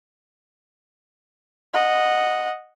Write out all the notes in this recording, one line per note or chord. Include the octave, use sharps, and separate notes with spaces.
D#5 F#5